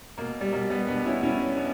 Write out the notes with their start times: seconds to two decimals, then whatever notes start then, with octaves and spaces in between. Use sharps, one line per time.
0.18 B2 A#3
0.41 G3
0.52 B2 A#3
0.70 G3 B3
0.87 B2 B3 D4
1.05 C#4 E4
1.23 B2 C#4 E4
1.57 B2 B3 D4